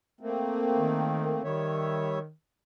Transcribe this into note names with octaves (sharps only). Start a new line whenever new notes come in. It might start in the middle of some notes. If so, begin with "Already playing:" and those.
A3 A#3 C4
D#3
D#3 G3 C#5 E5